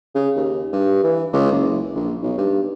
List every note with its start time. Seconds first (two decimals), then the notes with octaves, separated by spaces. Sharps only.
0.15 C#3
0.36 D#2
0.73 G2
1.03 E3
1.33 C#2
1.52 F#1
1.95 A#1
2.22 B1
2.37 G2